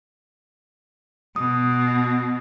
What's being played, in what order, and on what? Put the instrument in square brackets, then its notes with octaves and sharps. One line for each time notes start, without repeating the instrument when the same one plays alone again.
[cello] B2 [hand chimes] D#6